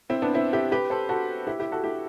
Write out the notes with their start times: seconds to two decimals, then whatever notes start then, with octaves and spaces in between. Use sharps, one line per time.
0.10 C4 E4
0.22 B3 D4
0.34 C4 E4
0.53 E4 G4
0.72 G4 B4
0.90 A4 C5
1.09 F#4 A4
1.47 E4 G4
1.60 E4 G4
1.72 F#4 A4
1.84 E4 G4